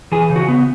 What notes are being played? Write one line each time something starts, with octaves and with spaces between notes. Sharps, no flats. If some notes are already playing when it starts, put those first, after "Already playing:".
E3 G#4
C#3
F#4
B3